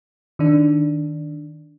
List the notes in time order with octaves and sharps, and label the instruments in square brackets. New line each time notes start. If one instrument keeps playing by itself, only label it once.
[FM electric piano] D#3 D4